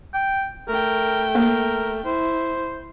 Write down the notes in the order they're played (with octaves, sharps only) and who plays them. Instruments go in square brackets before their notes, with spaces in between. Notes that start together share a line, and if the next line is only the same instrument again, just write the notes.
[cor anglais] G5
[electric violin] A3 G5 [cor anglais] A#4
[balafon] A#3 [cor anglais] A#4
[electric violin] E4 [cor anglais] C5